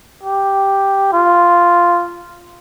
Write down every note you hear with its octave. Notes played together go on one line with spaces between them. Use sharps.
G4
F4